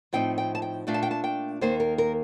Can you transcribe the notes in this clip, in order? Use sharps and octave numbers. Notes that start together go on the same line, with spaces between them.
A2 F3 C4 D#4 G5
G5
A5
G5
A#2 A3 D4 F4
A5
G5
A5
G5
D#2 D#3 A#3 D#4 C5
A#4
A#4